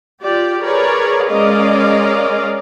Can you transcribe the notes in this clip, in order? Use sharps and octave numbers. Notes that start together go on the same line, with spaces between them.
F4 G4 D5
G#4 A#4 B4 C#5 D5
G#3 C#4 A#4 D5 D#5 F5